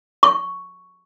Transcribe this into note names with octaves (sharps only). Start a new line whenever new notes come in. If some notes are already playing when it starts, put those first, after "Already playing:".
C#6